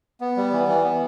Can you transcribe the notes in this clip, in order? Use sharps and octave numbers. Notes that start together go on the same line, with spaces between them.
B3
G3
E3
E3
B3